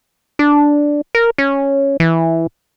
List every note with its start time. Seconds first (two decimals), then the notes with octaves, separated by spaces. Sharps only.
0.39 D4
1.15 A#4
1.38 C#4
2.00 E3